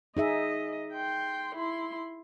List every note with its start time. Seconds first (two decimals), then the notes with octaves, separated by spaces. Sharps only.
0.17 D#4 G#4 D#5 E5
0.93 G5 C6
1.55 E4 C6